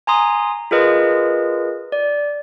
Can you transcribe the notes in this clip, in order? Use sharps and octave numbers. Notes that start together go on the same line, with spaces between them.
G#5 A#5 C6 D#6
F4 G#4 A#4 B4 D#5
D5